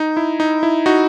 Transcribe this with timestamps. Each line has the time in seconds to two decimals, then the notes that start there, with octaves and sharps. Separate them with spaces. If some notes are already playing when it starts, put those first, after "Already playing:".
Already playing: D#4
0.17 E4
0.40 D#4
0.63 E4
0.86 D#4 F#4